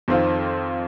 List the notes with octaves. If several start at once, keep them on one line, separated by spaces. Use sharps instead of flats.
F2 D#3 C4 F4